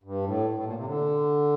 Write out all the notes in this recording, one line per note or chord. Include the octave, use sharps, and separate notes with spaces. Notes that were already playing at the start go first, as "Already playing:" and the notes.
G2
A2
A2
A#2
C3
D3